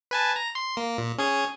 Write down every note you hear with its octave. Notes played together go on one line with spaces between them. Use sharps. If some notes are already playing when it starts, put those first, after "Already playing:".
B4 G#5 A5
A#5
C6
A#3
A#2
C#4 G#4 G#5